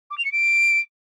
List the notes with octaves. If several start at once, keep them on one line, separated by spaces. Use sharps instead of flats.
D6
F7
C#7
D7